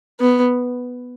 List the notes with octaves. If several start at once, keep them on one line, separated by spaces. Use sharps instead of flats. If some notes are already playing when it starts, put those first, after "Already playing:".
B3